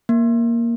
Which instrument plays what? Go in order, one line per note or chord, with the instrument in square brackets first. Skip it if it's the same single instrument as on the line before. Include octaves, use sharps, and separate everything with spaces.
[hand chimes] A#3